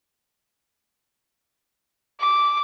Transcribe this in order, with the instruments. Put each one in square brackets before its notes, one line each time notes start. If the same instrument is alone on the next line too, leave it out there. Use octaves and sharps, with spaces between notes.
[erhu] D6